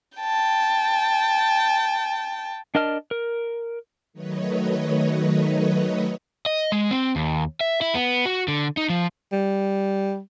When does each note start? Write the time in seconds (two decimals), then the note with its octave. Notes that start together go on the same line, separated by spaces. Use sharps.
0.18 G5 A5
2.75 D4 A#4 D#5 A5 F6
3.11 A#4
4.13 D#3 F#3 A3 B4 C#5 D#5
6.46 D#5
6.72 G#3
6.91 C4
7.16 D#2
7.61 E5
7.81 E4
7.95 B3
8.25 F#4
8.48 D3
8.77 D#4
8.89 F3
9.32 G3